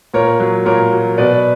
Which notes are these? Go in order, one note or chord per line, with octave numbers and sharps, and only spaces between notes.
A#2 A#4 C#5
F#3
A#2 A#4 C#5
F#3
B2 B4 D5